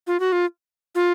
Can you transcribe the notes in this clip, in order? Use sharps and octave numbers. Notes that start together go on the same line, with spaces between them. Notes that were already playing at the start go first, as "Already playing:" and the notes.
F4
F#4
F4
F4